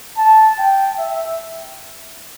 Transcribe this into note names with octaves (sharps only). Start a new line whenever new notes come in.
A5
G5
E5